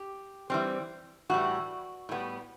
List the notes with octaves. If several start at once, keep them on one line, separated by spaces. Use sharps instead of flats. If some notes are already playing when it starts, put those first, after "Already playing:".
Already playing: G4
E3 G3 C4
A2 E3 G3 F#4
A2 G3 B3